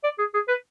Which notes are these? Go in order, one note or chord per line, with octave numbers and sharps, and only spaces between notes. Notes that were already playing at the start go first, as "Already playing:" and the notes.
D5
G#4
G#4
B4